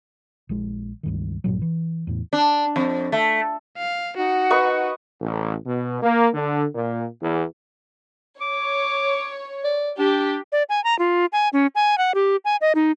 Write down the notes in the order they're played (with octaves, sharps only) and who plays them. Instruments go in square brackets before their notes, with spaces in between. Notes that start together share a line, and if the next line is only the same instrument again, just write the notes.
[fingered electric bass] A#1 G#3
C#2 G2 D#3
B1 G2 A#2 F#3
E3
E2 A2
[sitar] D4
F2
A3
[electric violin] F5
[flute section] D#4 F#5 [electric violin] F#4
[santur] B4 D#5 C#6
[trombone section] A1
B2
A#3
D3
A#2
E2
[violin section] C#5 [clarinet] D6
[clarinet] D5
[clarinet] D4 [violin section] G4
[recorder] D5
G#5
A#5
F4
G#5
C#4
G#5
F#5
G4
G#5
D#5
D#4